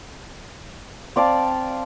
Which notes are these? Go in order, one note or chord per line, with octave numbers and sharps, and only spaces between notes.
C4 D5 F5 A5